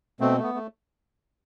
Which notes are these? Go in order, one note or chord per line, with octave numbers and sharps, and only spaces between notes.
B2 A3 C4
A3
B3
A3